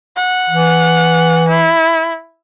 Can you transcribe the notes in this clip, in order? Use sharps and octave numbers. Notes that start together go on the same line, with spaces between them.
F#5
E3
E4